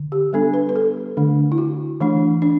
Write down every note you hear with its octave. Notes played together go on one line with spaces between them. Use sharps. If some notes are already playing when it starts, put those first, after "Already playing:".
Already playing: D3
G4
G3 B3 D4 A4
B4
B4
A4
D3 A3 D4
E4
F#4
E3 A3 D4
D4